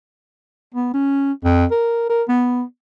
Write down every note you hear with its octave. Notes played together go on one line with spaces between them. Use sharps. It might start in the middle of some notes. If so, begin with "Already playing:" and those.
B3
C#4
F2
A#4
A#4
B3